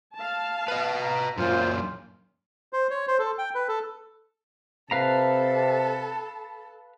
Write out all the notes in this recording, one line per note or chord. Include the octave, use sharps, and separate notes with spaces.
F5 A5
B4 D#5
A#5
F#2 A#2 F4 C5
C5
C#5
C5
A4
G5
B4
A4
C3 A4 B4 F5 A5 A#5